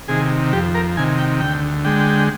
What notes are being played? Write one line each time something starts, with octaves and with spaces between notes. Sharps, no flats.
C3 D#3 G#4
F2 G4
A#4
C3 D#3 G#5
G5
D2 G5
D3 G#3 G5